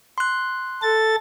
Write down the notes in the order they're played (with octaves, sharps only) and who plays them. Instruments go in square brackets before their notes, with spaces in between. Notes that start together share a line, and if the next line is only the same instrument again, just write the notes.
[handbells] C6 F#6
[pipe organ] A4 A6